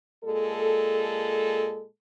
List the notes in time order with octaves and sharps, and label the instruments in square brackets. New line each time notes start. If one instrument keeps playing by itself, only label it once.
[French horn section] A#2 G#3 A4